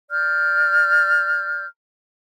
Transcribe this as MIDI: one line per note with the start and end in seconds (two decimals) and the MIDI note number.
0.10 1.65 74
0.10 1.65 89
0.10 1.65 91